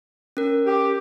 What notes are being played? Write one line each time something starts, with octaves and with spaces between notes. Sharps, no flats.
C#4 A#4
G4